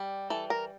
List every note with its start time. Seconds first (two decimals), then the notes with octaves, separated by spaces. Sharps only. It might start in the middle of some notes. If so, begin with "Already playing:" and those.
Already playing: G3
0.30 E3 A4
0.50 A#4